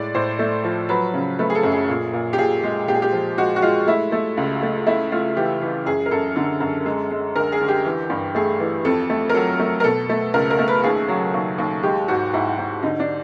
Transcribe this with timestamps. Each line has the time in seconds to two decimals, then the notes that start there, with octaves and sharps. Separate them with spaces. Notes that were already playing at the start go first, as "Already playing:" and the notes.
Already playing: A2 G#3 D5
0.14 A2 C5
0.39 A3
0.64 F3
0.89 F#3 B4
1.14 C#3
1.39 A3 B4
1.50 G#4
1.55 A4
1.63 F#2
1.72 G#4
1.88 A#2
2.13 A#2
2.33 G4
2.38 A#2 G#4
2.63 G#3
2.87 A#2 G4
2.95 G#4
3.02 G4
3.13 F3
3.38 G#3 F#4
3.56 F#4
3.62 G#3 F4
3.87 A3 E4
4.12 A3
4.37 C#2
4.63 A3
4.87 A3 E4
5.12 A3 F4
5.37 E3 G4
5.61 E3
5.86 F#2 G#4
6.06 A#4
6.11 F#2 A4
6.36 D3
6.60 F#2
6.86 G#3
7.11 G#3
7.35 D2 A#4
7.52 G#4
7.61 D2
7.68 G4
7.85 E3
8.10 G2
8.35 A3 G#4
8.60 E3
8.85 F2 A4
9.10 A3
9.30 A#4
9.34 F#3 A4
9.59 A3
9.80 A#4
9.84 B2 A4
10.09 A3
10.34 C#2 A#4
10.50 A#4
10.59 A3
10.68 B4
10.84 D#2 G#4
11.08 F#3
11.34 D#2
11.58 D#2
11.83 G#3 G4
12.08 G#2 F#4
12.33 G#2 E4
12.59 G#2
12.83 D3 D#4
12.99 D4